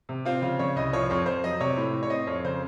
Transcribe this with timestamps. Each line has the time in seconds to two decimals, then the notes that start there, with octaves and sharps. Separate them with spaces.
0.09 C3
0.25 C4 F4
0.42 C#3 F4
0.59 C#3 C#5
0.76 C2 D#5
0.93 F3 C#5
1.10 F2 C#5
1.26 F2 C5
1.44 F#3 D#5
1.60 C3 C#5
1.76 A2
1.93 A2
2.03 C#5
2.10 C4 D#5
2.27 F2 C#5
2.44 C#3 C5